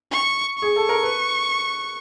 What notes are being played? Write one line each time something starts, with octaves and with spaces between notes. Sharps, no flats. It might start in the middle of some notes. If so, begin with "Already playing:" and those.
C#6
C#6
G#4
A4
A#4
B4